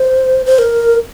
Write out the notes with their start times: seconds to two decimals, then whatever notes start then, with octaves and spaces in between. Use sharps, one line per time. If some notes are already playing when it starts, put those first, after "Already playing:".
Already playing: C5
0.46 C5
0.59 A#4